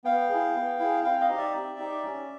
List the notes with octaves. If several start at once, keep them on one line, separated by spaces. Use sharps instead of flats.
B3 F5 G5
E4 G#4
B3
E4 G#4
C4 F5 G5
D#5 F5
D#4 G4
D5 E5
C4
D#4 G4
C#4